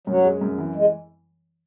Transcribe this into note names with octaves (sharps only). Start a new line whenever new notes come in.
F#2 F#3
G#3
F#2
E3
G#3